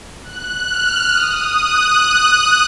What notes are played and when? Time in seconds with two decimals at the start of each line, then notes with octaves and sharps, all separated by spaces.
0.23 F#6
0.67 F6
1.12 D#6
1.57 F#6